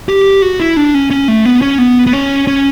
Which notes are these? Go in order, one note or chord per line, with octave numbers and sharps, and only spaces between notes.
G4
F#4
E4
D4
C#4
C#4
A3
B3
C#4
B3
B3
C#4
C#4